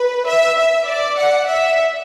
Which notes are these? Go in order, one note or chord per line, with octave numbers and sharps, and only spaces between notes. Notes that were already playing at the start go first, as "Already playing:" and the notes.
Already playing: B4
E5
E5
D5
F#5
E5